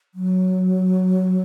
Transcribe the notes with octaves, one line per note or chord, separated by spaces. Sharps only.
F#3